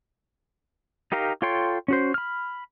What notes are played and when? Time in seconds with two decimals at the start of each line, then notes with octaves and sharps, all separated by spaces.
1.12 D#4 G4 A#4 F5 A#5
1.42 F4 A4 C#5 G5 C6
1.88 C#4 F#4 C5
2.14 B5 F6